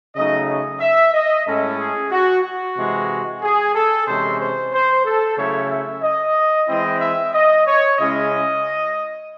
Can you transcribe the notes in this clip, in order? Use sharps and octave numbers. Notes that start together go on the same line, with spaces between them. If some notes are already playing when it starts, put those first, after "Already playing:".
C#3 F#3 A3 D#4 D#5
D#5
E5
D#5
A2 G#3 C#4 E4 A4
G#4
F#4
F#4
C3 E3 G#3
G#4
A4
C3 E3 G#3 C#4 C5
C5
C5
A4
C#3 F#3 A3 C#4 E4 C#5
E5
D#5
E3 G#3 C4 E4 D#5
E5
D#5
C#5
C#3 G#3 C#4 E4 D#5